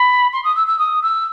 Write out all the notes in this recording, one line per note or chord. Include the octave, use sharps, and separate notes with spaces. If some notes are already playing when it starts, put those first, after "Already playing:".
Already playing: B5
C6
D#6
E6
E6
D#6
E6